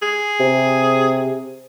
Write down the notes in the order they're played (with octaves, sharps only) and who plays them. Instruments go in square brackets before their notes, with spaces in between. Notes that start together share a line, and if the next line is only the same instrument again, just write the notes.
[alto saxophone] G#4
[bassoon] C3